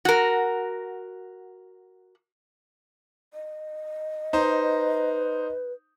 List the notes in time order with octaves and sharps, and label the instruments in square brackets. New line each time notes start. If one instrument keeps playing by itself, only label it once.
[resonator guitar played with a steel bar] F#4 A#4
[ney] D#5
[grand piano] D#4 C5 [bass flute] B4